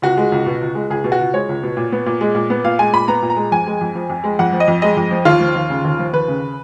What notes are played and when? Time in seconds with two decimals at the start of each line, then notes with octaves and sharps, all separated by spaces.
0.02 C#2 F#4
0.17 G#3
0.32 C#2
0.46 B2
0.61 C#2
0.75 G#3
0.90 C#2 G#4
1.04 B2
1.12 F#4
1.19 C#2
1.34 G#3 C#5
1.49 C#2
1.63 B2
1.77 A#2
1.92 B3
2.06 A#2
2.21 G#3
2.35 A#2
2.50 B3
2.64 A#2 F5
2.79 G#3 G#5
2.93 A#2 B5
3.08 B3 A#5
3.22 A#2
3.30 A#5
3.36 G#3
3.52 F2 G#5
3.67 G#3
3.81 F2
3.95 F3
4.10 F2
4.24 G#3
4.39 F2 F#5
4.53 F3
4.60 D#5
4.68 F2
4.82 G#3 D#5
4.97 F2
5.11 F3
5.25 D#2 F4
5.40 F3
5.55 D#2
5.70 C#3
5.85 D#2
5.99 F3
6.13 D#2 B4
6.28 C#3